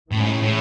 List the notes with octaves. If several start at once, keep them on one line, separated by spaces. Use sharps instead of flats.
A2 E3 G#3 C#4
G#2
A2
A2